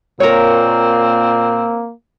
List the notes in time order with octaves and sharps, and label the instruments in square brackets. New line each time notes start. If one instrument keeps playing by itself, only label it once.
[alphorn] A#2 [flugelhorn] A#3 [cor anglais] C4 [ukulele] A#4 C#5